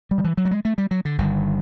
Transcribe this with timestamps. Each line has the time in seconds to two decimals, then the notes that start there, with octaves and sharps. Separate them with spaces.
0.11 G3
0.18 D#3
0.24 E3
0.37 F#3
0.45 G3
0.51 G#3
0.65 A3
0.78 G3
0.91 F#3
1.05 D3
1.18 G1 G2 D3 D#3